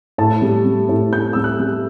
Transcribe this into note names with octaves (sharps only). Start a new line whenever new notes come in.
A2 A5
G3
G3
A2
A2 G6
G3 E6
F#6
G3